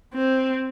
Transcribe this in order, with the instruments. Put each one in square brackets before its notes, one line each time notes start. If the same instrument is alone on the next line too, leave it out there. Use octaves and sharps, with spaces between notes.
[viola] C4